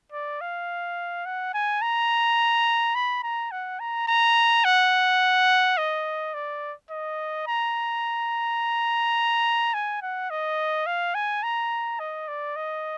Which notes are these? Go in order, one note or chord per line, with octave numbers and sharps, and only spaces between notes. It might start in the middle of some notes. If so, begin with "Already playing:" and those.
D5
F5
F#5
G#5
A#5
B5
A#5
F#5
A#5
A#5
F#5
D#5
D5
D#5
A#5
G#5
F#5
D#5
F5
G#5
A#5
D#5
D5
D#5